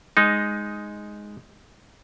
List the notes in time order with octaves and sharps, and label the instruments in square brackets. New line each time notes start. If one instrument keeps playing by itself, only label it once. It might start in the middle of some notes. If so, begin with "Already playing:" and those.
[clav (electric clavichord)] G#3 D#4